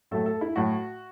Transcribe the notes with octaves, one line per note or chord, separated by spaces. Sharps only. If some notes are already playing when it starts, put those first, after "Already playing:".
A2 F#3 A3 A4
A4
E4
A2 F#3 A3 F#4